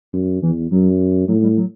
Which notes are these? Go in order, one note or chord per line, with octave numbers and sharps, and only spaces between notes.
F#2
E2 E3
F#2 F#3
A2 F#3
G3
F#3